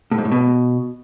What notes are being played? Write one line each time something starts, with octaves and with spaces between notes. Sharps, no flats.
A2
G#2
A2
B2